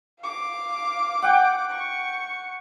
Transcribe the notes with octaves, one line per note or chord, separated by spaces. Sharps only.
F5 D6
F#5 G5
C#6